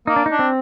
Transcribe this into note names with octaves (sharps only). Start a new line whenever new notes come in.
A#3 D#4
D4
D#4
D4
C4